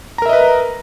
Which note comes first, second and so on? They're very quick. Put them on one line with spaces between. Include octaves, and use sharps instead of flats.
A#5 A#4 E5 D#5 B4